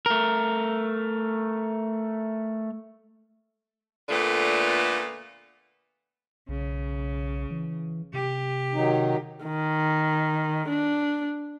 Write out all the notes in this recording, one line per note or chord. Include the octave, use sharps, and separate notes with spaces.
A3 A#4
A#2 D3 A3 B3 F4
B1 C#3
E3
C3 G4
D#3 F#3 D#4
D#3
D4